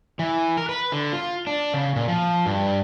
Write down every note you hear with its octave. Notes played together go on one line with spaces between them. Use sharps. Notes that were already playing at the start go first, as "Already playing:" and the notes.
E3
A#4
B4
D3
F4
D4
C#3
A#2
F3
G2